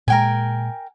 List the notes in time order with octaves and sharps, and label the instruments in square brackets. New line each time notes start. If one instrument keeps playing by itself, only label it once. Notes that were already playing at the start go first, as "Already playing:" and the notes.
[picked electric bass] A#2 G#3 [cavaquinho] A#4 G5 G#5